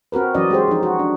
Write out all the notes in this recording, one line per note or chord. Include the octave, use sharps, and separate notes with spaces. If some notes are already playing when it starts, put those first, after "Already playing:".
C4 F#4 A#4 B4
E3 F#3 C#4 D5 D#5
G#3 G4 C5
F3 D#4
F#4
D4